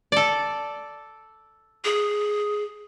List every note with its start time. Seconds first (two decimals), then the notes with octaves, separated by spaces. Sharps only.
0.12 A4 D5
1.85 G#4